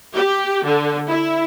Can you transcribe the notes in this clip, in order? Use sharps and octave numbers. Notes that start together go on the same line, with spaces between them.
G4
D3
E4